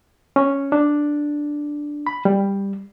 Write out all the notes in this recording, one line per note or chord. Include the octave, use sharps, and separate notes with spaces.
C#4
D4
B5
G3